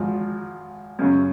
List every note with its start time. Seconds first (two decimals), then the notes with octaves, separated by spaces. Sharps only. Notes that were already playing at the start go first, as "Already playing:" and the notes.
Already playing: G#1 G#2 F3
0.99 F#2 C#3 F#3